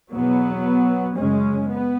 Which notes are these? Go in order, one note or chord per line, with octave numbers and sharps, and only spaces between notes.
E2 B2 F#3 B3
F#2 C#3 G#3 C#4
B3